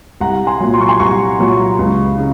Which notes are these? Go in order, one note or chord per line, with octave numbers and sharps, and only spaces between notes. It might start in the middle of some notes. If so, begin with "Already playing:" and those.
C2 F#5 A#5
G#5 C6
A#2 F#3
C6
C#6
G#5 C6
C2 A#5 C#6
A#2 F#3
C#2
C#3